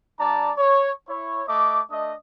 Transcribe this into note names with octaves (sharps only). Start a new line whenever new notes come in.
G3 D4 D5 A5 A#5
C#5
E4 C#5
A3 D#5 D6
A3 D4 D#5